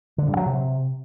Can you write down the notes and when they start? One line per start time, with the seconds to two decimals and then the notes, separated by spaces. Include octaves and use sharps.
0.18 D3
0.27 G2
0.37 F#3
0.46 C3